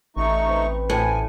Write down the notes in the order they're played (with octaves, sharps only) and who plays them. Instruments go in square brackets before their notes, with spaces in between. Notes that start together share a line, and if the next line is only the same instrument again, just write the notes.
[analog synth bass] A1 [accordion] A3 D#4 C#6
[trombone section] C4 B4
[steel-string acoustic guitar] A2 [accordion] G#5